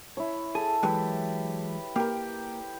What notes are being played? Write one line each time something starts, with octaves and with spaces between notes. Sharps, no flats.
E4 C#5
G#4 A4
E3 F#3 G#3 G4 B4
A#3 G4 A#4